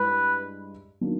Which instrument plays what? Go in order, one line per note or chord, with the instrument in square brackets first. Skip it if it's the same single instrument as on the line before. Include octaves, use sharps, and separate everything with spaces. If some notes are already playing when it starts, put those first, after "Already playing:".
Already playing: [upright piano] G2 G#3 E4 [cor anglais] B4
[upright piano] D#3 F#3 A#3 D4